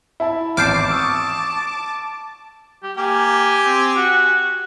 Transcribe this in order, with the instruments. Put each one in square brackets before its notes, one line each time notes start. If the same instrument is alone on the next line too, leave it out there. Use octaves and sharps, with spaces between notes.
[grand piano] E4 E5 A5
[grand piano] G#1 E2 D7 [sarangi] A5 [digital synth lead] D6 [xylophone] F6 G6 C7
[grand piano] C#6 D#6 E6
[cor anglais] G4
[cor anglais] A#3 [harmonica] G4 G5 G#5
[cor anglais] C4
F#4